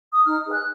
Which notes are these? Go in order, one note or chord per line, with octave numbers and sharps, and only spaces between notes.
D#6
D#4 F6
G#4 B4
F#6